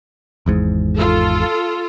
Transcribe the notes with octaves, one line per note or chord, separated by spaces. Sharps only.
G#1 E2 G#2
F4 A4